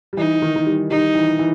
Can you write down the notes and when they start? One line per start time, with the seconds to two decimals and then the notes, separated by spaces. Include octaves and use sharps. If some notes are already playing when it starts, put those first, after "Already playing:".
0.13 G3
0.17 E3 D#4
0.42 D#3
0.56 D#3
0.66 G3
0.90 G3 D#4
1.15 E3
1.39 E3